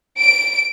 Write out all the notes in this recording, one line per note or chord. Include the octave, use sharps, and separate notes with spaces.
D7